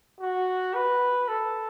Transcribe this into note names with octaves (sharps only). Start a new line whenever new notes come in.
F#4
B4
A4